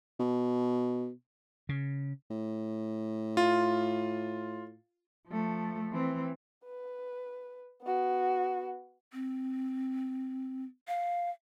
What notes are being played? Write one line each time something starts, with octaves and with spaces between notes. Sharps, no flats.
B2
C#3
A2
F4
F3 A3
E3 C4
B4
B3 F#4
C4
F5